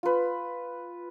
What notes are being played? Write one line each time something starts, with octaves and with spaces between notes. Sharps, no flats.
F4 B4